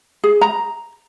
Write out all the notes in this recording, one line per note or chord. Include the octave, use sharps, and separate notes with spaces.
G#4
A#5